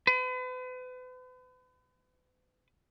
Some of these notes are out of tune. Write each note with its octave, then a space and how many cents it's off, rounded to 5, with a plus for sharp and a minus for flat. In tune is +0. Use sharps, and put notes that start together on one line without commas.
B4 +40